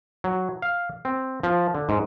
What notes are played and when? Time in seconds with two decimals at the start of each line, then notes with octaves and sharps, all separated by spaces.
0.24 F#3
0.62 F5
1.05 C4
1.43 F3
1.75 D3
1.89 G#2